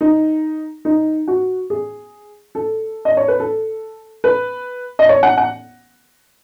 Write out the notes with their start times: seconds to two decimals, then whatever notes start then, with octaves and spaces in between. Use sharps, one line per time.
0.01 D#4
0.85 D#4
1.28 F#4
1.70 G#4
2.55 A4
3.05 D#5
3.17 C#5
3.28 B4
3.40 A4
4.24 B4
4.99 D#5
5.09 C#5
5.23 F#5
5.37 F#5